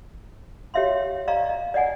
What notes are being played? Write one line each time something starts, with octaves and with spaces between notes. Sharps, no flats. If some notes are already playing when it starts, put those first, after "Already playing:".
G4 C#5 E5 F5 C6
D5 D#5 F5 A#5 C#6
D#5
D5 D#5 F#5 G#5